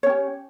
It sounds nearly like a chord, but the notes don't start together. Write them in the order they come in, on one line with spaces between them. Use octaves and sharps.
C#5 C#4 G4